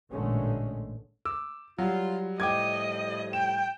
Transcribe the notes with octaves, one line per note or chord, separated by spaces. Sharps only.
A1 A#2 D3 G#3 A3 C#4
D6 E6
F#3 G3 F4
A2 F3 G3 D#5 G5 D6 G#6
G5 E7